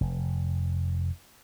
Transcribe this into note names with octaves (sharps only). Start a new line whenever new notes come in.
F1